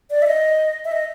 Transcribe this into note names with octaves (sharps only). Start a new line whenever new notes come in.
D5
E5
D#5
E5
D#5